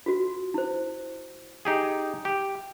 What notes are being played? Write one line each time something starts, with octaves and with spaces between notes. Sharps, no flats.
F4 F#4
E4 C5
D#4 G4 G#4
G4